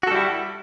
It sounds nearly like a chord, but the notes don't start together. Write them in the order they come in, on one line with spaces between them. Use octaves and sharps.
F#4 A4 G3 E4